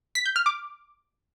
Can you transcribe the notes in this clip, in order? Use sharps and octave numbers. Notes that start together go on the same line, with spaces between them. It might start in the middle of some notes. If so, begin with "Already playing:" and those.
B6
G6
F6
D6